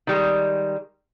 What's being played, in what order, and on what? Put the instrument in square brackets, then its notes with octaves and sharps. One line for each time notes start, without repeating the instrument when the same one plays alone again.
[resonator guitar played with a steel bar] D#3 G3 G#3